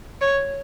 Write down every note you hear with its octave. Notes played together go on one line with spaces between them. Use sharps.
C#5